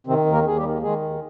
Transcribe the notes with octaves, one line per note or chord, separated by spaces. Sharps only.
C3 D#3 C4
D#2
A#3 A#4
D#2 G#4
G3 G4
D#3
D#3 G#3 G#4
D#2